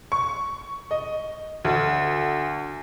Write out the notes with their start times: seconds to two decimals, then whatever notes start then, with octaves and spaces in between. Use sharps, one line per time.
0.12 C#6
0.91 D#5
1.65 D2